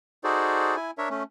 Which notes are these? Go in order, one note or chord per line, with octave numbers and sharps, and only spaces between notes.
D#4 F#4 G#4 A4 C5 D5
E4 G#5
D4 A#4 C#5 E5
A3 C#4